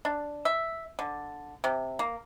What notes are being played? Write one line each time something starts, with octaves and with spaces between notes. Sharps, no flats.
D4
E5
D3
C3
A#3